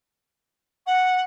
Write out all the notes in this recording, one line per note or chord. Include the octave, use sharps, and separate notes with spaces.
F#5